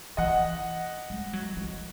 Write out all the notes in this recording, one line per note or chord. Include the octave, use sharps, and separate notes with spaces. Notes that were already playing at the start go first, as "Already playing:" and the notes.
E3 D#5 F#5
G#3
F#3
E3